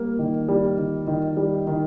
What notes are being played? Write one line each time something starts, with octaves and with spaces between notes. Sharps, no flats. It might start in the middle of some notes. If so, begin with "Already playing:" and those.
Already playing: G3 A#3
D#3
G3
D#3
D#3
G3
D#3